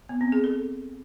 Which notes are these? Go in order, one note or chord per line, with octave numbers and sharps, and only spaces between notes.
B3
C4
G#4
A4